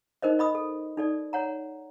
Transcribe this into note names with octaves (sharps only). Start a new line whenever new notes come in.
D#4 A#4 C5 D#5
D#5 B5 D#6
A4
D#4 A4 D5
C#5 F#5 A#5